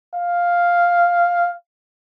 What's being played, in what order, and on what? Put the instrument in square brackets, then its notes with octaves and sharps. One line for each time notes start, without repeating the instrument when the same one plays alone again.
[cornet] F5